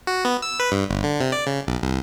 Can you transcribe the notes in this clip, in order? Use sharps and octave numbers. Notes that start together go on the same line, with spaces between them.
F#4
B3
E6
B4
G2
G1
D3
C3
D5
C#3
B1
C2